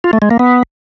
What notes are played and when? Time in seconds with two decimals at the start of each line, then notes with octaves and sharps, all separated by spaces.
0.04 F4
0.13 A3
0.22 G#3
0.31 A#3
0.39 B3